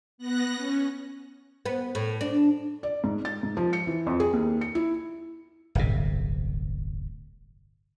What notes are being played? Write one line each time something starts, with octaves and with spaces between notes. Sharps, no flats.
B3 F#6 A#6
C#4
B3
A2
D4
D5
G#2
A6
G#2
F3
C#7
E3
F2
G#4
D#2
C#7
E4
D1 G1 C3